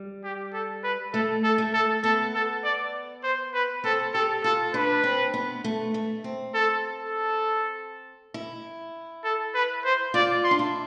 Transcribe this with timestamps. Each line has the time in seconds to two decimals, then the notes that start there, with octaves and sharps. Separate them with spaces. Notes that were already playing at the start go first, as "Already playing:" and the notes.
Already playing: G3
0.24 G4
0.53 A4
0.84 B4
1.14 A3 A4
1.44 A4
1.58 A3
1.74 A4
2.03 B3 A4
2.34 A4
2.64 D5
3.24 C5
3.54 B4
3.84 C4 A4
4.14 G4 A4
4.44 F4 A4
4.74 D4 B4
5.04 C4
5.34 B3
5.64 A3
5.94 A3
6.24 C4
6.54 A4
6.99 A4
8.34 E4
9.24 A4
9.55 B4
9.85 C5
10.14 F4 D5
10.44 C6
10.51 D4
10.59 E4